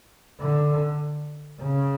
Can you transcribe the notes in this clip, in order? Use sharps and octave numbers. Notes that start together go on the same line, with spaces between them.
D3
C#3